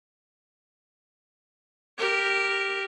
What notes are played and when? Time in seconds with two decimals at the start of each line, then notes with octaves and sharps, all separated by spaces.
1.98 G4 A#4